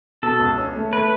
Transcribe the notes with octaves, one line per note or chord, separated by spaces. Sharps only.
B2 A4
C#2
C#4
A3
A3 B4